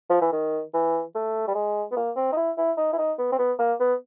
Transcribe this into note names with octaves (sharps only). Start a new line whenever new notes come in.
F3
E3
D#3
E3
A3
G3
G#3
B3
A#3
C4
D#4
E4
E4
D#4
E4
D#4
B3
C4
B3
A#3
B3